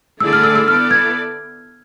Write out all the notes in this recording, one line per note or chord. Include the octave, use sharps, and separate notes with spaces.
D3 A3 E4 G#4 D5 E6
F6
E6
E6
B3 E4 A4 D5 F6
G#6